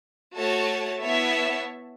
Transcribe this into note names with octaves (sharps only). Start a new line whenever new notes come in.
A3 F#4 C#5 A5
B3 E4 C#5 E5 A5